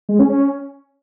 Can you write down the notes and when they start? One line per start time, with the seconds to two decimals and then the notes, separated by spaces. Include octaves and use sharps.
0.09 G#3
0.19 C#4
0.30 C#4